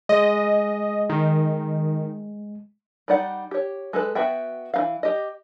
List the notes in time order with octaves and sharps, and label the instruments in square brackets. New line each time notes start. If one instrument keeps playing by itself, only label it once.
[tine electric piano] G#3 [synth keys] D#5
[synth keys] D#3
[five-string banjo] G3 D#4 D5 F#5
G4 C#5
G#3 A4 B4
B3 F#4 E5 G5
E3 D#4 F5
G4 D#5